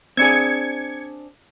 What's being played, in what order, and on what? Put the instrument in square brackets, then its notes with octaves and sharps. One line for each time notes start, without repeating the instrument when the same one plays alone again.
[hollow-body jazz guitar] C4 D4 G#4 [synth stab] G#6 C#7